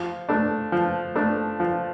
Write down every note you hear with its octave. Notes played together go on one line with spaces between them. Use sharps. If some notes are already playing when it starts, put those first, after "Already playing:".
Already playing: F3
A3 D4
F3
A3 D4
F3